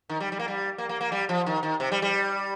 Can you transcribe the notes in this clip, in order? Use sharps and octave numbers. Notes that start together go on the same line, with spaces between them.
D#3
G3
G3
A#3
G3
A#3
A#3
A#3
G3
F3
D#3
D#3
C3
G3
G3